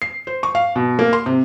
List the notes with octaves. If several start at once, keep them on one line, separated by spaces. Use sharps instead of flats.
C7
C5
C#6
F5
B2
A#3
C6
C3